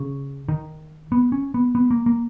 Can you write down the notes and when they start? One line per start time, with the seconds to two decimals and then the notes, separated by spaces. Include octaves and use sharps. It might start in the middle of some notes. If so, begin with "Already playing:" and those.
Already playing: C#3
0.49 D#3
1.12 B3
1.32 C#4
1.54 B3
1.75 B3
1.91 A#3
2.06 A#3